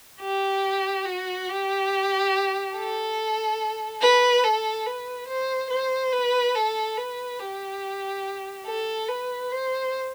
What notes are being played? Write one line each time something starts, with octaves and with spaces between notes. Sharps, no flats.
G4
F#4
G4
A4
B4
A4
B4
C5
C5
B4
A4
B4
G4
A4
B4
C5